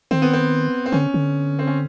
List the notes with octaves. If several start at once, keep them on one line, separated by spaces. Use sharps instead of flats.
D#3 C4
B3
C4
C4
D3 C#4
D3
C4
C#4